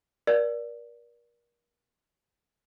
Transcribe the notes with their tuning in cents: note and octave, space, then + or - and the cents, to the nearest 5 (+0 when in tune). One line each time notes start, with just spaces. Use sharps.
A#4 +35 D5 +0